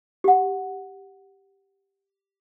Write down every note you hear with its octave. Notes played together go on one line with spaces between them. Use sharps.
G4 F#5